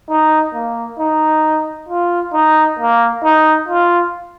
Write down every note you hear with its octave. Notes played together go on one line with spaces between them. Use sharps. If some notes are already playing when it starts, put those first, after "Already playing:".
D#4
A#3
D#4
F4
D#4
A#3
D#4
F4